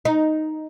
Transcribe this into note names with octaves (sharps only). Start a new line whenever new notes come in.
D#4